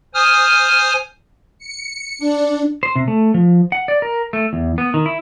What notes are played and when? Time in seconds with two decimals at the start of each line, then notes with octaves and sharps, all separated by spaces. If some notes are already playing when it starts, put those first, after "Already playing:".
0.14 C5 G#5 D#6 F6
1.59 C#7
2.19 D4
2.83 C5
2.96 C3
3.08 A3
3.34 F3
3.72 F#5
3.88 D5
4.02 A#4
4.33 A3
4.53 E2
4.78 B3
4.94 D#3
5.06 E4